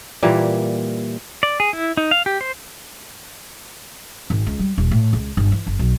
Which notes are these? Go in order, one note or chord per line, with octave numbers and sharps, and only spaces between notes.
A#2 E3 G3 A#3
D5
G#4
E4
D#4
F5
G4
C5
G#1
C#2
G3
D#1
A2
C#2
G1
E3
F#1
B1